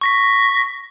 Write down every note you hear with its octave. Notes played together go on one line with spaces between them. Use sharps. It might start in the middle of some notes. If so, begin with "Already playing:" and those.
C#6 A#6 B6